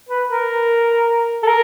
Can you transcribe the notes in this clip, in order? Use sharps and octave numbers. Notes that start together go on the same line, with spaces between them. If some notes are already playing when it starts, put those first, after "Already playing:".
B4
A#4
A4
A#4